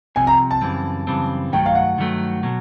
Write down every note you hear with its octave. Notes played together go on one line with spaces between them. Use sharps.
C2 C3 F3 G#5
A#5
A5
F#2 C#3 E3 G3 C4
F#2 C#3 E3 G3 C4
G2 D#3 F#3 A3 G5
F5
F#5
G2 D#3 F#3 A3
B2 F#3